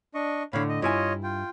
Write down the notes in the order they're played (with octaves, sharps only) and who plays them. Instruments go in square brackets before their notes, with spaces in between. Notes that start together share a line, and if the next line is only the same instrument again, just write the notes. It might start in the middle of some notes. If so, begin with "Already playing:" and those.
[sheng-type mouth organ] D4 D#5 C#6
[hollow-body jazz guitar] A2 D3 [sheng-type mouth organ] C#5 F5 B5
[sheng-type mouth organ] D#5
[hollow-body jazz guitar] G2 E4 G#5 [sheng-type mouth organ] F4 C#5 D#5
[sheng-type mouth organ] F4 G5